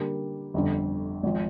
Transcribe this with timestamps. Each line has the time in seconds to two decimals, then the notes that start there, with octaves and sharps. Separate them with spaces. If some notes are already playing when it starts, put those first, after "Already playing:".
Already playing: D3 G3 A#3
0.54 G1 F2 D3
1.23 G#1 F3